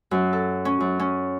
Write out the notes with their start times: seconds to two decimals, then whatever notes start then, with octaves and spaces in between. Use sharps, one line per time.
0.11 F#2
0.33 A4
0.65 C#4
0.80 F#2
1.00 C#4